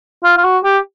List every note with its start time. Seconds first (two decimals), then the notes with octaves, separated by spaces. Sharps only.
0.24 F4
0.37 F4
0.44 F#4
0.64 G4